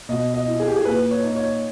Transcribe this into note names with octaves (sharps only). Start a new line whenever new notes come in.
B2 D#5
D#5
E4
G#4
G4
G#4
A#2 B4
C#5
D#4
C#5